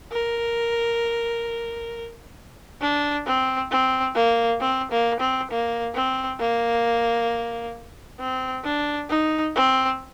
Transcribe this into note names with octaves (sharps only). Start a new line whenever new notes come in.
A#4
D4
C4
C4
A#3
C4
A#3
C4
A#3
C4
A#3
C4
D4
D#4
C4